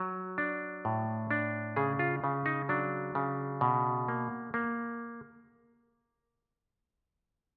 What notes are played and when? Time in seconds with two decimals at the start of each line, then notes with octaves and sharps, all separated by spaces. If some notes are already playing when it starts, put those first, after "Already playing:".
Already playing: F#3
0.38 D4
0.85 A2
1.31 D4
1.76 C#3 G#4
1.99 F4
2.24 C#3
2.46 D#4
2.69 F#3 D4
3.15 C#3
3.61 B2
4.08 A#3
4.54 A#3